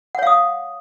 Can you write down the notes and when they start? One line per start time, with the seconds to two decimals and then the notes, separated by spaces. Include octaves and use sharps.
0.15 F#5
0.19 C#5
0.23 F5
0.27 D#6